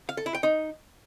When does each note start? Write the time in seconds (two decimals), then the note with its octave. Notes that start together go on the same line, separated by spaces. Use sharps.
0.09 F5
0.17 A4
0.26 E4
0.35 G5
0.43 D#4